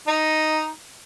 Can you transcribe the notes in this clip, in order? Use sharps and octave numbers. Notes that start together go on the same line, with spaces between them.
D#4